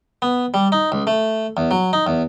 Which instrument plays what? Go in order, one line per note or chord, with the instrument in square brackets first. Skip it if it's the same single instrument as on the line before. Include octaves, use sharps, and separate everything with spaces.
[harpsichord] B3
G3
D#4
C#2
A3
E2
F#3
D#4
E2